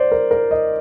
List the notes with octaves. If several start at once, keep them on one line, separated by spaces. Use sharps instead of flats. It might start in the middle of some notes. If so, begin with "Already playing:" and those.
Already playing: C5 D5
A#4
A#4
D#5